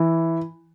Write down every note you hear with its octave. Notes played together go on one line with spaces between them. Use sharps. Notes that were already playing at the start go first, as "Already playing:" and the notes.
Already playing: E3